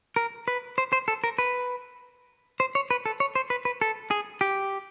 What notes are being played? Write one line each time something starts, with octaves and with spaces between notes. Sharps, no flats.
A#4
B4
C5
C5
A4
A#4
B4
C5
C#5
B4
A4
C#5
C5
B4
B4
A4
G#4
G4